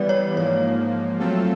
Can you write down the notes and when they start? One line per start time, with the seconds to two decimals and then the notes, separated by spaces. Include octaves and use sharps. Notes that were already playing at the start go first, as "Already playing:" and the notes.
Already playing: E3 G3 B3 B4 D5
0.09 C#5
0.37 G#2 F3 A#3 C#5
1.19 F#3 A3 C4 F4 A4